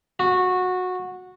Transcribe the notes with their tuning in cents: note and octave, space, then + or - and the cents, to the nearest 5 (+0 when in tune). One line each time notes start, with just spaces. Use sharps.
F#4 -15